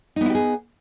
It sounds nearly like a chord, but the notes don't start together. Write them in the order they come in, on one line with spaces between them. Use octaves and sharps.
D#4 B3 E4 G4 G#4